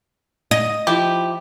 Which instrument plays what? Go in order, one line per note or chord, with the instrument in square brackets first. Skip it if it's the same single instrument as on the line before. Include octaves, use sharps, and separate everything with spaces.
[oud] D#5
[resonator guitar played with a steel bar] F3 E4 [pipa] G4